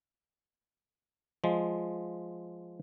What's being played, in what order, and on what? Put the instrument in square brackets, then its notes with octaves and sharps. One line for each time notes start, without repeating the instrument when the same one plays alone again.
[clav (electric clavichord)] F3 G#3